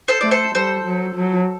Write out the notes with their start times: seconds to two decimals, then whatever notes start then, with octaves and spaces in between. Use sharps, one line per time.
0.08 A4 C5
0.21 A3 D5
0.31 A4 C5
0.55 G3 A4 C5
0.85 F#3
1.15 F#3